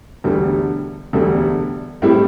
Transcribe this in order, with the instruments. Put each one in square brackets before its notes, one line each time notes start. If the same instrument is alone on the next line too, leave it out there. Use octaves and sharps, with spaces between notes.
[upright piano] E1 D2 D3 G3
E1 D2 D3 G3
A2 G3 C4 E4 G4